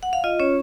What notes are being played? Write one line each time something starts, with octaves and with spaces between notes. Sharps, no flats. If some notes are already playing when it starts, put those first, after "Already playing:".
F#5
F5
F4 D#5
C#4 C#5